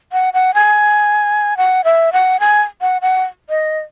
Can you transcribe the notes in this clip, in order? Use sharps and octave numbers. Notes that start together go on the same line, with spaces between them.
F#5
F#5
G#5
F#5
E5
F#5
G#5
F#5
F#5
D#5